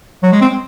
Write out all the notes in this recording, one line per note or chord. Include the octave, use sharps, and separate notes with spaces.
F#3
G#3
C4